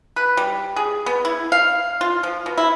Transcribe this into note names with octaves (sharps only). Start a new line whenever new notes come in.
B4
G3
G#4
B3
E4
F5
F4
F3
B2
E4